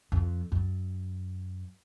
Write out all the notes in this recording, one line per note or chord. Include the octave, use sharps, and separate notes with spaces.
F2
F#2